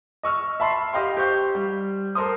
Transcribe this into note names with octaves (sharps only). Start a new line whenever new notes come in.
D#5 C#6 E6 F6
E5 A5 B5 C6 C7
G4 D#5 F5 G5 C6
G4 C5 C#6 G6
G3
A4 A#4 C5 C6 D#6